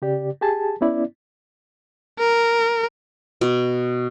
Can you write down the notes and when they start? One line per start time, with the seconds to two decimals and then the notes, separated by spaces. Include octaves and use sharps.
0.02 C#3 G4 D5
0.41 G4 G#4 G#5 A5
0.81 B3 C#4 E4 D5
2.19 A#4
3.41 B2